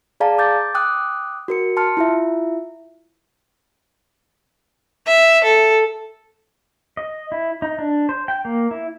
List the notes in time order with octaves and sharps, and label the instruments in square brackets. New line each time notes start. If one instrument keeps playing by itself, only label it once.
[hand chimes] G#4 D5 F5 A5 A#5
D6 G6 A6
G5 D6 D#6 F#6
F#4 A#4 C#7
A5 C6 F6 C#7
E4 F4 E5
[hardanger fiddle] E5
A4
[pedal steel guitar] D#5
E4
D#4
D4
C5
G5
A#3
E4